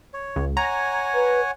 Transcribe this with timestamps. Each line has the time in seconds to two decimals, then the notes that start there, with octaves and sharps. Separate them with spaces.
0.14 C#5
0.36 C#2
0.57 C#5 F#5 G#5 A#5
1.14 B4